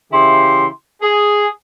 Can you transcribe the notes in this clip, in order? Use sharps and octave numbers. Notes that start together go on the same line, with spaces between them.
C#3 E3 E4 G4 C6
G#4